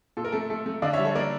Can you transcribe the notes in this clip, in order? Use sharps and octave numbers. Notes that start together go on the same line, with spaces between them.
A#2 A4
A#4
A3 A4
A3 A4
A3
D3 D5 F5
C#5 E5
G3
A4 C#5
A#3 A#4 D5